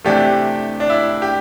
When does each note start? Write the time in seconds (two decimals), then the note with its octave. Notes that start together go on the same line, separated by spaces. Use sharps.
0.04 C3 E3 A3 D4 G4
0.80 D4
0.90 E4
1.22 G4